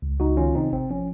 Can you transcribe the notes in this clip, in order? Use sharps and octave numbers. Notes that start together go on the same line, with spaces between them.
C#2
C#2 D#4 F#4
D#3 C#4 F4
C3 C4 D#4
G#1 C4
F3 C#4